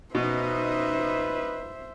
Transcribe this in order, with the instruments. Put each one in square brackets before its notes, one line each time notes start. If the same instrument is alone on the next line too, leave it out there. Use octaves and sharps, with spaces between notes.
[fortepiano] B2 [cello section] C#4 D#4 D#5 [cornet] B4 [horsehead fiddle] C5 E5